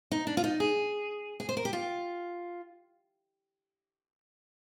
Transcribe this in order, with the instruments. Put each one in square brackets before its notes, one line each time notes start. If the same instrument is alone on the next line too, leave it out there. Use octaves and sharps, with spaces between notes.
[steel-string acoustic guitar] D#4
D4
F4
D#4
G#4
G#4
C5
A#4
G4
F4